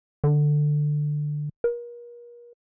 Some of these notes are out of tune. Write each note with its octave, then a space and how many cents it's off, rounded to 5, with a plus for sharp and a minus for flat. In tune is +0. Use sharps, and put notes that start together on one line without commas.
D3 +15
A#4 +40